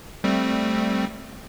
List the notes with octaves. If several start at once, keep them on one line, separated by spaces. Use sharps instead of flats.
G3 A3 C4